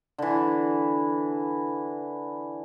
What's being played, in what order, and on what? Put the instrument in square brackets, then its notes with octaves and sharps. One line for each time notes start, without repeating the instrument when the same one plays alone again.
[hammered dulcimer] D3 E3